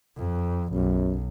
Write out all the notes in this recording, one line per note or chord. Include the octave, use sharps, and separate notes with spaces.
F2
B1 F#2